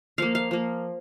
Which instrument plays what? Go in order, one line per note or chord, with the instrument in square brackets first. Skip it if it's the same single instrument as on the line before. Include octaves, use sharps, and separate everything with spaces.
[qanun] F3 A#3 F5
F5
F3 A#3